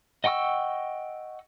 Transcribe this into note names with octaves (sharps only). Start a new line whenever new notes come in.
D#5 F#5 G5 C#6 E6